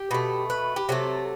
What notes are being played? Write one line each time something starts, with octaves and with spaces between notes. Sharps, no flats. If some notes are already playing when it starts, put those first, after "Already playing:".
Already playing: G4
B2 A3
B4
G4
C3 F#3 A3 A4